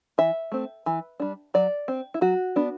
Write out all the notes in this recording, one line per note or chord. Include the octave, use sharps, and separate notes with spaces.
E3 E5
A3 C4
E3
G3 D4
F#3 D5
C4
E4
F#3 F#4
B3 D4